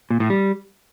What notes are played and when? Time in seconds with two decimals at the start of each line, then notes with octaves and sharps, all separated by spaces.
0.10 A#2
0.20 A2
0.30 G3